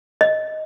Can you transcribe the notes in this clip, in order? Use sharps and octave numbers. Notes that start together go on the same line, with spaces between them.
D#5